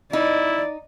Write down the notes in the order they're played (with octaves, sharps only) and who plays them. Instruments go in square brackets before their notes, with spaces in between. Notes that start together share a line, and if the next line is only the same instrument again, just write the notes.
[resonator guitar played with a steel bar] D#4 [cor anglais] E4 [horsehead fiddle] D5